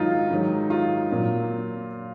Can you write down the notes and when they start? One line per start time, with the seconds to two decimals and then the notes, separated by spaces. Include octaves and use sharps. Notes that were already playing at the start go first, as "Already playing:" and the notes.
Already playing: G#2 D#3 F#3 D#4 F4
0.30 G#2 D#3 F#3
0.70 F4
1.09 A#2 F#3